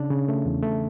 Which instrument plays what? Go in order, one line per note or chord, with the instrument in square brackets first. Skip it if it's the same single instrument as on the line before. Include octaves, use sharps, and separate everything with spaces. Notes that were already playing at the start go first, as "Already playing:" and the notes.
Already playing: [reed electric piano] C#3 D4
C#3
A3
E2
A3